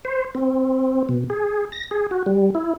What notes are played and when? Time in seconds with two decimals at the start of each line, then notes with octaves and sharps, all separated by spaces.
0.05 C5
0.35 C4
1.09 B2
1.30 G#4
1.72 A#6
1.91 G#4
2.11 F#4
2.26 G3
2.55 E4